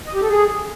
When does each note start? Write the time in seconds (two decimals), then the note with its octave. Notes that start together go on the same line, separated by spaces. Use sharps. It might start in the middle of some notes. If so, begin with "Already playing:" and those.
0.07 D#5
0.14 G4
0.22 A4
0.29 G#4